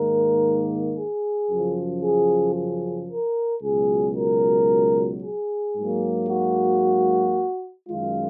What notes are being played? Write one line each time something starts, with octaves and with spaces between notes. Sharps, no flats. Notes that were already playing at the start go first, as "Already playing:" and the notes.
Already playing: G#2 D#3 A#3 A#4
G#4
F#2 C#3 F3
G#4
G#4
A#4
C#2 B2 F#3 G#4
A#4
G#4
G#2 F#3 A#3
F#4
F#2 D#3 G#3 F4